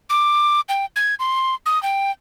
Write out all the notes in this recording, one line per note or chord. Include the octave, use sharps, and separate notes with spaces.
D6
G5
G#6
C6
D#6
G5